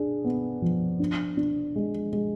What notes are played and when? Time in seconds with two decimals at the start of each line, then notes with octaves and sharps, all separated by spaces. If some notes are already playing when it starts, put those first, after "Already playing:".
Already playing: D4 G#4
0.24 B3
0.62 F3
1.00 D4
1.37 D4
1.76 G#3
2.13 G#3